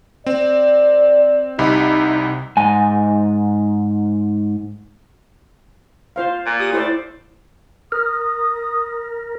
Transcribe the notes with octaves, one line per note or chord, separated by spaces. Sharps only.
C4 D5
C2 C3 D#4 B5
G#2 G#5
F4 C5 F5
A#2
G4 D#6
A2 E4 A4 C5 D5
A#4 D#6